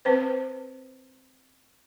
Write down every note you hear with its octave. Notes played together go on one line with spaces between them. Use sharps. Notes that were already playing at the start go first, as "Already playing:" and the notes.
C4 B4 C5